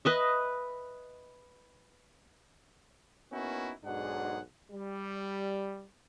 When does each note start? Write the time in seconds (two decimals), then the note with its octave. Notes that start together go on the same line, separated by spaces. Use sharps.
0.05 B4 D#5 E5
3.31 A#3 B3 C#4 D#4 E4 F#4
3.84 B1 G#2 D4 F#4 G#4 F#5
4.71 G3